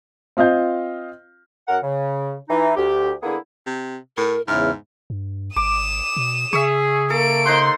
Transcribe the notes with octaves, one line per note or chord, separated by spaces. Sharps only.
C4 F4 D#5 F5 G6
F#2 A#4 F#5
C#3
E3 D#4
D2 G4
D3 A#3 B3 E4 G#4
C3
A2 A#4
E2 G#2 C#3 E4 F6
G2
G#1 D6 D#6 E7
B2
C#3 G#4 E5 C#6
A#3 A4 D7
D#4 C5 F#5 C6